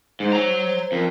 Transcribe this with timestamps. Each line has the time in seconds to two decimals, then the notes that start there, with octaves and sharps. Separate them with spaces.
0.20 G#2 C5
0.33 C#5 A#5
0.92 F2 A#4